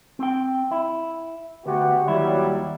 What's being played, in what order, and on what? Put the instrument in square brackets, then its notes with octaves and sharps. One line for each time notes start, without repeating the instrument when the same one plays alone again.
[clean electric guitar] C4 G5
E4
[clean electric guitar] D2 [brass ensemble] B3 F#4 G4
[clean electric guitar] D#2 E4 [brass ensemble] F#3 G3